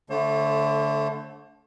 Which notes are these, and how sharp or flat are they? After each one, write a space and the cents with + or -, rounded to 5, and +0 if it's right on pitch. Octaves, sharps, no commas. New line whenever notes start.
D3 -20 A3 +0 C5 +40